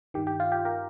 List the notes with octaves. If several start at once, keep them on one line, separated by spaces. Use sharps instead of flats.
G2 D#3 G4
G4
F4
G4
G4 A#4